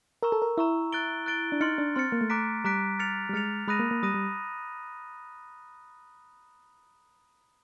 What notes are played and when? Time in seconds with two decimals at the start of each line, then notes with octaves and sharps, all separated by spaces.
0.23 A#4 A#5 C#6 E6
0.32 A4
0.42 A#4
0.58 E4 A#5 C#6 E6
0.92 F#6 A6 D7 G7
1.26 F#6 A6 D7 G7
1.52 D4
1.61 D#4 C6 F6 A6 C#7
1.78 D4
1.95 C4 C6 F6 A6 C#7
2.12 A#3
2.21 A3
2.30 A#5 D6 F#6 B6 D7
2.64 G3 A#5 D6 F#6 B6 D7
2.99 F6 A6 C#7 F7
3.29 G3
3.33 G#3 F6 A6 C#7 F7
3.68 G#3 B5 D#6 F#6 A#6 D#7
3.79 A#3
3.91 A#3
4.02 G3 B5 D#6 F#6 A#6 D#7
4.14 G3